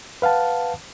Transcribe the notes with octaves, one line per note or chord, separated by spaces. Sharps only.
B4 F5 F#5 A5